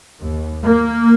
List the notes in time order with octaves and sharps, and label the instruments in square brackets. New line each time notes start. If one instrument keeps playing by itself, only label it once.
[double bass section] D#2
A#3